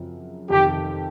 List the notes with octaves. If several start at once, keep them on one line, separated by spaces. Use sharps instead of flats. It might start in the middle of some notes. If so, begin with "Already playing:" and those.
Already playing: F#2 C#3 F3 C4
F2 C3 D#3 G4